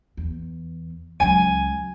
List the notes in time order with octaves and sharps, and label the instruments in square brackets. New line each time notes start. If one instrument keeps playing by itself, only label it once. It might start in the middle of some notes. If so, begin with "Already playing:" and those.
[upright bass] E2
[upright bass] C#2 F#3 [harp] G#5